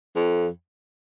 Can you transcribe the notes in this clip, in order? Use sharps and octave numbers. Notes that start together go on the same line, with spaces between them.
F2